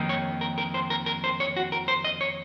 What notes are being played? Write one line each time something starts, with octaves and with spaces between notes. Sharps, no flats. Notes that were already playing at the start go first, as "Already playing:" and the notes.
Already playing: F2 D#3 A#3 D#4
C#5
A#4
A#4
C5
A#4
A#4
C5
C#5
F#4
A#4
C5
D#5
C#5